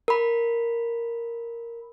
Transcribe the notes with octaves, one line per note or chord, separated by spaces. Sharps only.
A#4 B5